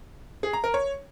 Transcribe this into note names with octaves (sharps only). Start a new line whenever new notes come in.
G#4
A#5
A#4
C#5